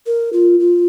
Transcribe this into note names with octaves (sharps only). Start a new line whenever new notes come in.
A#4
F4
F4